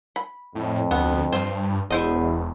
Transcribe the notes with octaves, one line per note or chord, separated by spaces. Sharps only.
B5
F2 A2
D2 B3
G2 F4 C5
E1 E2 E4 C5 D#5